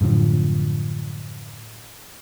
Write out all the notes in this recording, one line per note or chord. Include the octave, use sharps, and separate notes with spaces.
F#2 A2 D3 F3